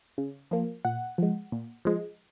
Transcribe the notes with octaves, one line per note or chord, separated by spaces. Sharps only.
C#3
F3 A#3
A#2 F#5
F3 G#3
A#2
F3 G#3